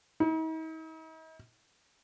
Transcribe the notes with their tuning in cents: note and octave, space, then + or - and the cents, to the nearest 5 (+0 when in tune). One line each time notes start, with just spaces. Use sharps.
D#4 +45